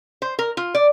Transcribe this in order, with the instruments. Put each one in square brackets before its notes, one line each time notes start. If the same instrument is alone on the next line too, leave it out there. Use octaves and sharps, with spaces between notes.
[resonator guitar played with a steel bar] C5
A#4
F4
D5